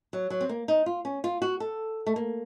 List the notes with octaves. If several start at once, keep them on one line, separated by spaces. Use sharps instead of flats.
F#3
F#3
C4
A#3
D#4
F4
C#4
F4
F#4
A4
A3
A#3